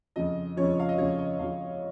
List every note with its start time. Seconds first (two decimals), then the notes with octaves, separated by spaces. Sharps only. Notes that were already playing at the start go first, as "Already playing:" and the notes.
0.16 F2 C#3 F3 D#5
0.57 F2 C#3 F3 C#5
0.80 F5
0.89 D#5
0.98 F2 C#3 F3 C#5
1.19 D#5
1.39 F2 C#3 F3 F5